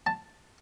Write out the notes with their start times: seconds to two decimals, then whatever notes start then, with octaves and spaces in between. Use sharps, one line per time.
0.07 A5